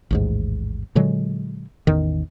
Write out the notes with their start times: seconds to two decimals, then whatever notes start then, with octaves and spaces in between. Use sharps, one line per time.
0.11 A1 D#2 G#2
0.95 A#2 D3 F#3 G#3
1.87 A1 E2 D#3